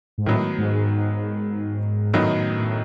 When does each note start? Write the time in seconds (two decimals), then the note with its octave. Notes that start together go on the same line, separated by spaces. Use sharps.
0.18 G#2
0.26 A2 D#3 F#3 B3
0.58 G#2
0.89 G#2
2.14 F#2 A2 D#3 F#3 B3 D#4
2.60 A2